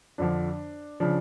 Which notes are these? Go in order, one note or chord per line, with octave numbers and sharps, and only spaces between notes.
F2 D3 F3 D4
C#3 F3 D4